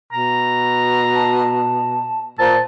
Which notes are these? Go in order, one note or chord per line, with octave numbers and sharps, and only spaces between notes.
B2 A#5
A5
A#2 C5 A5